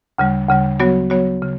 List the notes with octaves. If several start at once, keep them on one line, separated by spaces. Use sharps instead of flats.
D2 C#3 G3
D2 C#3 G3
F#3 B3 F#4 C#5
F#3 B3 F#4 C#5
C#3